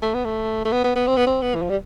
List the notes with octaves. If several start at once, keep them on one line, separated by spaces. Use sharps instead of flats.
A3
B3
A3
A3
B3
B3
B3
C4
B3
C4
B3
E3
F3
G3